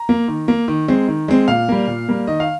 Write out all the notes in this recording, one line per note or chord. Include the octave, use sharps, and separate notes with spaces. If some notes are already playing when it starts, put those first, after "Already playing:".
Already playing: A#5
A#3
D#3
A#3
D#3
G#3 C4
D#3
G#3 C4
A#2 F5
G3 A#3
A#2
G3 A#3
D#3 D#5
F5